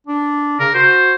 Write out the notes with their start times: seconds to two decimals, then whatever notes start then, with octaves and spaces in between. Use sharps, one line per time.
0.07 D4
0.60 C#3 A#4
0.75 F#4 C5